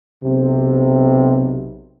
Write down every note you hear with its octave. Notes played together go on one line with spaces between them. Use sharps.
B1 C3